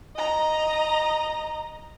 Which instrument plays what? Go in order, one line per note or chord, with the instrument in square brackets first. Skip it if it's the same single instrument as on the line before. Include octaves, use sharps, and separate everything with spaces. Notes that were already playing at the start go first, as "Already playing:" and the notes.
[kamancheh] D#5 A#5